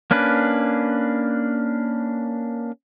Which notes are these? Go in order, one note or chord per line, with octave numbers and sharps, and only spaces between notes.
A#3 C#4 D4 B4